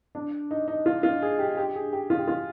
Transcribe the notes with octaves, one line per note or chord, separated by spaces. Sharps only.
D4
D#4
D#4
F4
F4
G#4
G4
G4
G#4
G4
F4
G4
F4